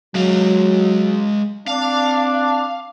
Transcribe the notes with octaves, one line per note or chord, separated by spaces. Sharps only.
F#3 G#3 F5
C4 D4 F5